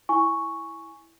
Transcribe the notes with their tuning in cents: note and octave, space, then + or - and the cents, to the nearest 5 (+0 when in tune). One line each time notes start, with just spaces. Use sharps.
E4 +0 G#5 +0 C#6 +0